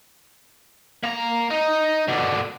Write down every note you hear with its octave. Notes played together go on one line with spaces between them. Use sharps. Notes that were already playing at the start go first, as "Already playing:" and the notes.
A#3 A#5
D#4
B2 D3